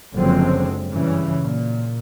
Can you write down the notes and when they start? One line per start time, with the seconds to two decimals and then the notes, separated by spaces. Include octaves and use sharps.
0.15 F#1 D3 F3 G#3 C4
0.91 G2 C#3 E3
1.44 A#2